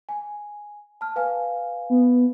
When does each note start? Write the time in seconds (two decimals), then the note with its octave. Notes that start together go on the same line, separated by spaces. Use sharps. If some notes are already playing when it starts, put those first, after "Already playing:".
0.09 G#5
1.01 A5 F6
1.16 B4 F5 G#5
1.90 B3